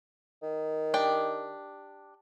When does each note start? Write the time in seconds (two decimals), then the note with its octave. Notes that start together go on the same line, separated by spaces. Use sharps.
0.43 D#3
0.94 D4 G4 G5